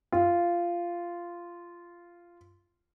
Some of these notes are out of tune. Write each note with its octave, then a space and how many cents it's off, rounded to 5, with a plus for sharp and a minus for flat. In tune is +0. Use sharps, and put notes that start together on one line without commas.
F4 -10